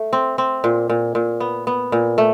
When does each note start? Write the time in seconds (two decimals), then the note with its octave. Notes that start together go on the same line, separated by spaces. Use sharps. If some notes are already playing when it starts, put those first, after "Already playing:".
Already playing: A3
0.13 C4
0.38 C4
0.64 A#2
0.90 A#2
1.15 A#2
1.40 B3
1.67 B3
1.92 A#2
2.18 A3